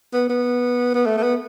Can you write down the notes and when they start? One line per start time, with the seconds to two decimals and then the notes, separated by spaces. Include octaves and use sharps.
0.13 B3
0.29 B3
0.94 B3
1.06 A3
1.18 A3
1.23 B3